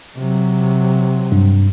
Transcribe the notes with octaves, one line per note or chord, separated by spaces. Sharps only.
C3 F#3
G2